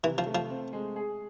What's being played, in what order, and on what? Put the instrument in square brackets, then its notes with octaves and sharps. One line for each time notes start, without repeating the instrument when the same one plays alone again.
[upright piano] C3 [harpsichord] E3
[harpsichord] F3
[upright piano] A3
[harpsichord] F3
[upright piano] C4
G#3
G#4